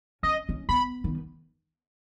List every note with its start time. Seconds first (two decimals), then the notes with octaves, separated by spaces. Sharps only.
0.23 C#4 D#5
0.49 C#4
0.69 B3 B5
1.04 D#3